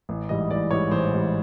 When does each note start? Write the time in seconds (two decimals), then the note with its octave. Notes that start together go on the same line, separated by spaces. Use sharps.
0.09 A1
0.29 G#2 E3 G3 D#5
0.50 A1 D5
0.71 G#2 E3 G3 C#5
0.91 A1 C5
1.12 G#2 E3 G3